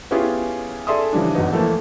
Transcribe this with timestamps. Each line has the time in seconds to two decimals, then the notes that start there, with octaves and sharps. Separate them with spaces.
0.11 B3 C#4 E4 F4 G4 G#4
0.87 G#4 A4 D5 E5 C6 D#6
1.13 C#3 E3 F3 G3 D4
1.34 A1 E2 G#2 F#3 B3 D#4
1.53 E3 F3 A3 A#3 A4